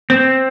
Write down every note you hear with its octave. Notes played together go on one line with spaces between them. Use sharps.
C4